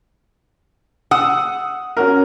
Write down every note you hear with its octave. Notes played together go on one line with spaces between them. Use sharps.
F#5 D#6 E6
C#4 F#4 A#4